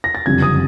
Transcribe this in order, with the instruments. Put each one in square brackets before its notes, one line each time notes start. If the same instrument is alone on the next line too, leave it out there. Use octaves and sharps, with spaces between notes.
[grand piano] A#6
A6
F#1 F2 D3 G3 G#6
D#6